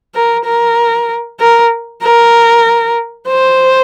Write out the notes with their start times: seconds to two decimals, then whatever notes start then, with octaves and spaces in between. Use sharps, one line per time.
0.15 A#4
0.46 A#4
1.40 A#4
2.03 A#4
3.28 C5